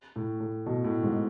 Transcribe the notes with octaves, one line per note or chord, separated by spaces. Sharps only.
A2
A2
B2
A2
G#2